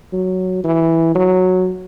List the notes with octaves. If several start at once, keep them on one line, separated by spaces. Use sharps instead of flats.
F#3
E3
F#3